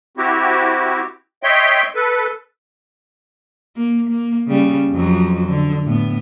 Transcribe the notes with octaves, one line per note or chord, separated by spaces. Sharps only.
C4 E4 F#4 G4
C#5 D#5 E5 G5 C6
A4 B4
A#3
A#3
C#3 G3
F2 F3 F#3
D3
A2 B3